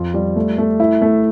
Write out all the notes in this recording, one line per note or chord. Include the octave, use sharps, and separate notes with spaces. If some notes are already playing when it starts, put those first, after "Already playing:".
Already playing: F2 F4
G3
A3
A3
E4
A3